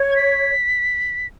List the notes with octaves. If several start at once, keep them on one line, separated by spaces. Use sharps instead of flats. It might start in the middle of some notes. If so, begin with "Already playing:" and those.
Already playing: C#5
G#6
B6